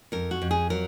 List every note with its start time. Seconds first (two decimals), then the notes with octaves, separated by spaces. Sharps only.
0.12 F2 A#4
0.31 F#4
0.42 F2
0.51 G#4
0.70 F#3 A#4